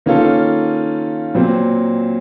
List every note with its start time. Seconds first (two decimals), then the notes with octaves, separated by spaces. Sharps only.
0.06 D#3 A#3 C#4 F4 A4
1.34 A#2 F#3 C4